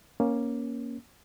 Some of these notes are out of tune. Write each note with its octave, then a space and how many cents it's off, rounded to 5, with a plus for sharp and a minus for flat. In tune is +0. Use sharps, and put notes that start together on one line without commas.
A#3 +15 C#4 +0